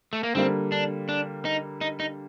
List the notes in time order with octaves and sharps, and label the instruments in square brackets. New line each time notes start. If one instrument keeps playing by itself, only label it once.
[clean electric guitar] A3
A#3
[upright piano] D3 G3 A#3 [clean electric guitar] C4
[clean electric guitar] D4
D4
D#4
D#4
D#4